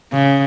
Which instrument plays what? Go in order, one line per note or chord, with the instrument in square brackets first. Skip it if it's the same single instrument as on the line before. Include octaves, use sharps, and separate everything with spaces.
[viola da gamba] C#3